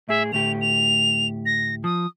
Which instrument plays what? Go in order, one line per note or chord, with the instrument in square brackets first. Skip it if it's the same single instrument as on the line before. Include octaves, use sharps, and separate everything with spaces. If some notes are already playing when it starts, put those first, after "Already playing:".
[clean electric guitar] A2 G#4 [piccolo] E5
[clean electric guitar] D2 A2 G4 [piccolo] F7
[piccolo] F7
A#6
[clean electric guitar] F3 [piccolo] D#6